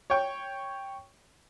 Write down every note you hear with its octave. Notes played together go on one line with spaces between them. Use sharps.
C#5 G5